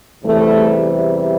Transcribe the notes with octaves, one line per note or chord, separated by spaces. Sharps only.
E2 C3 E3 G3 A3